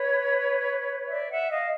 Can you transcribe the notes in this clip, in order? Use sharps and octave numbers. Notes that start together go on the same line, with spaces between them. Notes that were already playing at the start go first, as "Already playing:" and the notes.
Already playing: B4 C#5
D5 E5
E5 F#5
D#5 F5